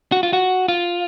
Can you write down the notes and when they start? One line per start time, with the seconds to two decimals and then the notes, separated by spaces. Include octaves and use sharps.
0.12 F#4
0.23 F4
0.33 F#4
0.68 F4